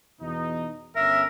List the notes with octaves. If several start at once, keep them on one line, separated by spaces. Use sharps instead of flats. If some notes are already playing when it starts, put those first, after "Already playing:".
E2 B2 D#4
G1 C#4 A#4 E5